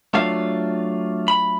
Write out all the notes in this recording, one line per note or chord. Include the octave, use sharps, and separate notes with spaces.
F#3 A3 D4 F4 F5
B5